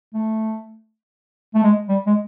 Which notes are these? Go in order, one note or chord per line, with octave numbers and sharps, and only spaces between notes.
A3
A3
G#3
G3
G#3